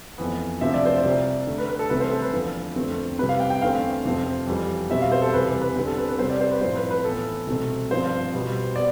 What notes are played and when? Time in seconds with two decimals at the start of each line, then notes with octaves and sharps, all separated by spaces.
0.18 F2 E3 B3
0.61 D2 C3 F3 C4 E5
0.74 D5
0.85 C5
0.98 D5
1.04 C2 C3 G3
1.47 D2 D3 A3
1.58 B4
1.68 B4
1.79 A4
1.90 C2 C3 E3 A3 C4 B4
2.00 C5
2.11 A4
2.22 B4
2.33 E2 D3 F3 B3
2.76 F2 D3 A3 C4
3.19 C2 C3 G3 C4 B4
3.29 F5
3.40 G5
3.50 G5
3.62 E2 D3 A3 C4 F5
4.05 F2 C3 F3 C4
4.47 F2 E3 G3
4.90 B2 G3 C4 E5
5.01 F5
5.12 C5
5.22 A4
5.33 E2 C3 E3 G3 B4
5.47 B4
5.62 B4
5.76 E2 D3 G3 C4
5.87 A4
5.98 B4
6.09 B4
6.19 C2 C3 G3 C4 C5
6.30 D5
6.41 C5
6.52 B4
6.61 A2 F3 C4 C5
6.76 B4
6.91 B4
7.04 A2 E3 B3 A4
7.47 C2 B2 A3 C4
7.91 G2 D3 F3 C4 C5
8.34 B2 G3 B3
8.76 B3 D5